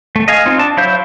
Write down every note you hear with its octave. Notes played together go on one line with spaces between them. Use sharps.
A3
D#5 F5 G#5
C4 D#4 F4
D4 A5
F#3 E4 C5 F5 G6